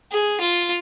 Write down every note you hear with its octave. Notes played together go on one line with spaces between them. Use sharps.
G#4
F4